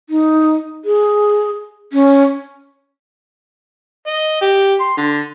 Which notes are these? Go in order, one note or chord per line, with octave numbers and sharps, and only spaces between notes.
D#4
G#4
C#4
D#5
G4
C6
D3